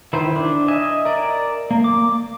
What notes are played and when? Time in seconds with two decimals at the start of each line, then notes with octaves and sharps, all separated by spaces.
0.13 D#3 E4 B4 C5
0.36 D4
0.68 D#5 E5 G#5
1.05 A#4 D5
1.71 A#3
1.84 D6